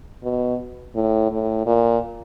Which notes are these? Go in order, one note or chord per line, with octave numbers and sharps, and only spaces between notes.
B2
A2
A2
A#2